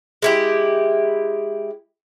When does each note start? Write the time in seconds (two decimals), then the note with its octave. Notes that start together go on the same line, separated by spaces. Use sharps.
0.22 G#3 E4 G4